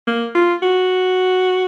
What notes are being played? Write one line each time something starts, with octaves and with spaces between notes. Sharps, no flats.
A#3
F4
F#4